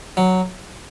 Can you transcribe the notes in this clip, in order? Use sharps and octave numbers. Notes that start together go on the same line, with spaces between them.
F#3